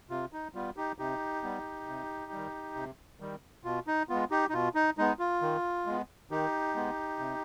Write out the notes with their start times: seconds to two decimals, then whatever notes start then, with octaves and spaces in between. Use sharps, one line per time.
0.10 C3 F4
0.33 D#4
0.55 G3 B3 F4
0.77 D#4 G4
0.99 C3 D#4 G4
1.43 G3 B3
1.87 C3
2.32 D#3 G3
2.75 C3
3.20 D#3 G3
3.64 B2 F4
3.87 D#4
4.09 G#3 B3 F4
4.31 D#4 G4
4.49 D#4
4.53 B2 F4
4.75 D#4
4.98 G#3 B3 D#4
5.19 F4
5.41 D#3
5.86 G#3 B3
6.31 D#3 D#4 G4
6.75 G#3 B3
7.19 C3